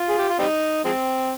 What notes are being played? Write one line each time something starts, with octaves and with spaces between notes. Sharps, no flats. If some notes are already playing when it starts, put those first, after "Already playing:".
Already playing: F4
G#4
G4
F4
G3 C4 D#4
F3 G#3 C4